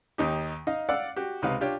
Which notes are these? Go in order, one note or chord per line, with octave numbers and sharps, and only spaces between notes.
D#2 D#4 G4
D#4 D#5 F5
D5 F5 F#5 E6
F#4 G4
C#2 C3 D#4 B4 F5
D4 F4 G4 C#5